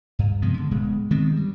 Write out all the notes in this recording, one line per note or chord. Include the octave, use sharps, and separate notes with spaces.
G2
C3 F3 G#3 B3
D3
D1 B2 G#3
D#3 G#3 B3 C4
G2 G3